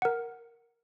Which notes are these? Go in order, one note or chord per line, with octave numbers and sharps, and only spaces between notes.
A#4 F#5